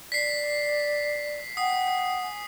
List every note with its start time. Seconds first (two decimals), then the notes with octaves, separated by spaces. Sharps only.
0.12 D5 B6 C7
1.57 F#5 G5 D#6 C7
2.21 G#5